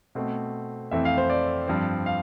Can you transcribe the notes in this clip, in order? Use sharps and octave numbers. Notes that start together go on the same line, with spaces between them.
B2 A3 C4
F2 E3 A3 C4 E5
F5
C5
D5
G2 F3 C4
F5